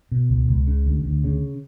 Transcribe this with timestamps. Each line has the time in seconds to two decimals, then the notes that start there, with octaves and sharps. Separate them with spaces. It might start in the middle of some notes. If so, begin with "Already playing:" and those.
0.11 B2
0.30 C#2
0.49 C#2
0.67 C#3
0.86 D2
1.06 D2
1.24 C#3